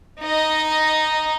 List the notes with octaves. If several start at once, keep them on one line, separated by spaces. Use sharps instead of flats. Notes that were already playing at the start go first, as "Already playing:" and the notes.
D#4 D#5